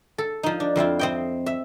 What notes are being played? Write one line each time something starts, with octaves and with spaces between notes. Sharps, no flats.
A4
F3 D#4
D4
F2 C4 E4 F4
C4 D#5 G5
E5